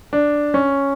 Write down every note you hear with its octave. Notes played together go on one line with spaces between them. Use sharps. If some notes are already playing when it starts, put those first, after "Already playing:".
D4
C#4